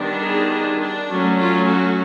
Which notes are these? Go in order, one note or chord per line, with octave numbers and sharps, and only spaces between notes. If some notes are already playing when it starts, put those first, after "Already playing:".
Already playing: D#3 G3 B3 D4
G#4
G#4
D4
F#3 A3 C#4
F4
F#4